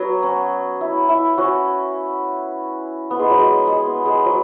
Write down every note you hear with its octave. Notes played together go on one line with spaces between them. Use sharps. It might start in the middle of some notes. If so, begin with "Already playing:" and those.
Already playing: F#3 B3
C#4
E4
E4
C#4 F#4
B3
G#3
F#3
G#3
G#3
B3
G#3
F#3